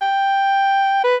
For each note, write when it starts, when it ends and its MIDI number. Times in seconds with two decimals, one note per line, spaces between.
0.02 1.02 79
1.04 1.16 71